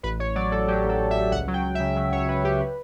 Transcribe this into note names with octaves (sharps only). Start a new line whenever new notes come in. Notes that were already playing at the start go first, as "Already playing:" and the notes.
A1 B4
A1 C#5
F#3 D5
A1 A4
F#3 G4
A1
A4
A1
E5
A1
C#2 F#5
F#3
G5
F#3
E5
C#3
F#3
C#2 C#5
F#3 B4
C#2 G4
B4